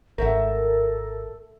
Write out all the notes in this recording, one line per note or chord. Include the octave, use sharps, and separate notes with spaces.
G#1 A3 A4 A#4 E5 F#5